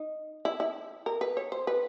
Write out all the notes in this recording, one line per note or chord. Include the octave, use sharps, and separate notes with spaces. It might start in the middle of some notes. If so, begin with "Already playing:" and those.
Already playing: D#4
E4
E4
A#4
B4
C#5
C5
B4